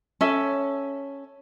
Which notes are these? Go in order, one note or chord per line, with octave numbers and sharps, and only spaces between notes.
C#4 A4 E5